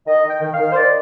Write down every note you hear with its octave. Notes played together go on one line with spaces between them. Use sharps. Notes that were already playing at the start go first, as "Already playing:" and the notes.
D#3 D#5
D#3
G5
D#3
F5
D#3
C5
D#3 D5